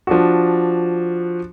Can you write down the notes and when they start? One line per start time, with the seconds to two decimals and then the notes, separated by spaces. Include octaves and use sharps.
0.07 F3 D4 F#4